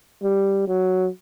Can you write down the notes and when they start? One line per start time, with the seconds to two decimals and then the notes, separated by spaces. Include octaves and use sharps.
0.23 G3
0.68 F#3